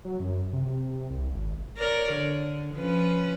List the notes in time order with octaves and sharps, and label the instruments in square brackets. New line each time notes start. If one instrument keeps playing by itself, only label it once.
[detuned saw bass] F#3
F#2
C3
C2
G#1
[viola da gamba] A#4 C#5 D5
D3
F3 C#4 B4